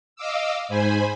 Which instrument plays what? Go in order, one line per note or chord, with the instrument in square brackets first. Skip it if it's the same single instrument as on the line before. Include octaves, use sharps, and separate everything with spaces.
[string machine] D#5 F5 D6 E6
G#2 C5 G#5 B5